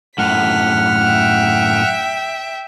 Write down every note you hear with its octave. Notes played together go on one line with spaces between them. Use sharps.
F#2 A2 F#5 F6 B6
E5 G5